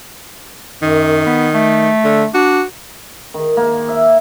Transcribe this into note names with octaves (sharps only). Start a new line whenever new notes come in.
F#2 D#3
B3
A3
D3
D4 F#4
D#3
A#3
E5